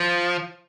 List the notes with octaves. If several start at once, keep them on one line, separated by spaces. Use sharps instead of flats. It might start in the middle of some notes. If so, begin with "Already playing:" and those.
Already playing: F3